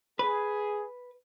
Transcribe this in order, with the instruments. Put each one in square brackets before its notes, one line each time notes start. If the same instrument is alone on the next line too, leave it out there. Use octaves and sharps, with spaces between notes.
[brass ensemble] G#4 [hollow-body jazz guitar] B4